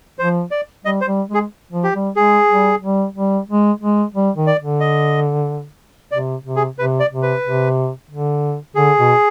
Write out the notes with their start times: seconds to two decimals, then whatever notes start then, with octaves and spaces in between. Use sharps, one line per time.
0.19 F3 C5
0.51 D5
0.85 G3 D#5
1.01 C5
1.07 G3
1.29 G#3 G#4
1.72 F3
1.84 G4
1.94 G3
2.16 G#3 G#4
2.50 G3
2.82 G3
3.16 G3
3.49 G#3
3.81 G#3
4.15 G3
4.36 D#3
4.47 D5
4.59 D3
4.80 D#5
6.12 C3 D5
6.45 C3
6.56 G#4
6.78 C3 B4
7.00 D5
7.11 C3
7.23 B4
7.44 C3
8.11 D3
8.75 D3 G#4
8.98 B2